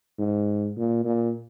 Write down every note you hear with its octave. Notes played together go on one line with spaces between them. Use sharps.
G#2
A#2
A#2